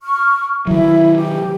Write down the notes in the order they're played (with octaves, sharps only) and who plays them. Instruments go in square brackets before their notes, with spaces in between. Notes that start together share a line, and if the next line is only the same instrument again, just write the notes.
[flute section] C#6 F6
[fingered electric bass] D#3 F#3 [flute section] E4 E5
[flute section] G4